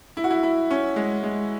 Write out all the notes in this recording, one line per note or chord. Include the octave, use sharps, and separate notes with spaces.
E4
F#4
E4
E4
C#4
G#3
G#3